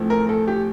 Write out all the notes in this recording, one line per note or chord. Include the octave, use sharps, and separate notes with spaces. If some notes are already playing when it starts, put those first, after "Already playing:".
Already playing: A1 A2 F3 A3 C4
A#4
A4
G4